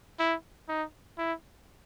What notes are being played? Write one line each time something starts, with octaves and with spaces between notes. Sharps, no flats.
E4
D#4
E4